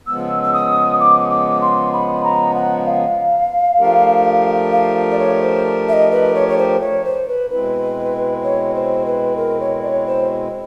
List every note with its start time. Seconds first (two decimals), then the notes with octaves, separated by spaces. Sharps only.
0.07 C#3 F3 G#3 B3 E6
0.43 E6
0.53 D#6
1.00 D6
1.31 D6
1.62 C6
1.93 B5
2.24 A#5
2.55 F#5
2.86 F5
3.78 F3 A3 D4 G4 A#4
4.72 F5
5.11 D5
5.19 C#5
5.42 C5
5.88 E5
5.93 D#5
6.11 B4
6.35 C#5
6.48 C#5
6.58 C5
6.81 C#5
7.05 C5
7.28 B4
7.50 B2 G#3 C4 E4 B4
8.44 C#5
8.75 C5
9.06 B4
9.37 A#4
9.60 C#5
9.83 D5
9.87 C#5
10.07 C5